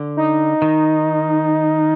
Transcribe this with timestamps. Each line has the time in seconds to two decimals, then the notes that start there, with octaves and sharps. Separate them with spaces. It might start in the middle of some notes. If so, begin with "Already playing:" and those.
Already playing: D3
0.17 D#4
0.62 D#3